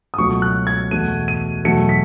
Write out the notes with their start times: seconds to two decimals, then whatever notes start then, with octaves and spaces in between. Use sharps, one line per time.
0.14 D#6
0.18 C#2 B2 F#3 A3 C#6
0.42 F#6
0.67 G#6
0.91 E2 B2 A3 D#7
1.28 D#7
1.65 E2 B2 F#3 A3 C#7
1.89 B6